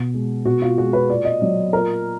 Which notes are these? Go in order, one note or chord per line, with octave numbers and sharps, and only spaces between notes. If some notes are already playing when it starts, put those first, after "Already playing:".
Already playing: B2
G#3
B2 F#4
F4
G#3 F#4
B4
A#2 D5
D#5
F#3 D5
A#2 A#4